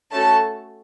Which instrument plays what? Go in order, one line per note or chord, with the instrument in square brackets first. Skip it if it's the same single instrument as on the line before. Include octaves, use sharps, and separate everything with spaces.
[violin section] A3 C#4 F#4 A4 A5